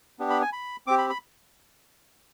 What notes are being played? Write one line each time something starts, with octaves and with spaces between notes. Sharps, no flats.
B3 D4 G4
B5
G#5
B5
C4 G4 D6
B5
B5